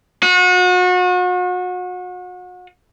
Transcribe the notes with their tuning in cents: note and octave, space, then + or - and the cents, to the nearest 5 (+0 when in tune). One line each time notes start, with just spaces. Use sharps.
F#4 -35